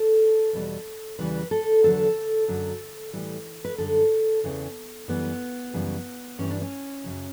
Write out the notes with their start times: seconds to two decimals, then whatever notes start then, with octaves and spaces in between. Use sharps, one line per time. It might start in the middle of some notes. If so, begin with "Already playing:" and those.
Already playing: A4
0.53 E2 B2 G3
1.18 E2 C#3 E3 G3 B4
1.51 A4
1.84 E2 D3 F#3 A4
2.48 F#2 D3 F#3
3.13 A2 E3 G3
3.65 B4
3.78 F#2 D3 G3 A4
4.44 E2 C#3 E3
5.08 F#2 E3 G3 B3
5.74 F#2 C#3 E3 G3
6.38 G2 E3 G3 C#4
6.50 D4
6.61 C#4
7.04 F#2 C#3 F#3